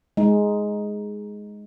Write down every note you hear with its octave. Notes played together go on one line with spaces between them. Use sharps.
G#3 D#4